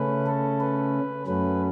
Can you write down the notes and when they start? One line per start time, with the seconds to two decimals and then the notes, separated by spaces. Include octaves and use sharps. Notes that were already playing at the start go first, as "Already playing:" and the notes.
Already playing: C#3 A3 C#4 B4
0.26 A4
0.61 B4
1.27 F#2 F#3 A3 C#4 B4